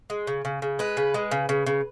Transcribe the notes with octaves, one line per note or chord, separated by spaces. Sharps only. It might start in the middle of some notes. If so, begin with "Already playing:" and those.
G#3
C#3
C#3
C#3
G#3 B4
C#3
G#3
C#3
C#3
C#3